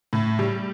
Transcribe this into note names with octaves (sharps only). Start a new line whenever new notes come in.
A2
G3